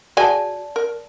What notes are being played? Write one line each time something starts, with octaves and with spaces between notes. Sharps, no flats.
F#4 G#4 D5 G#5 A5
A#4